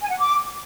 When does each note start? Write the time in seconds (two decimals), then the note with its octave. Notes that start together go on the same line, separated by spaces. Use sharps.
0.02 G#5
0.11 F#5
0.19 D6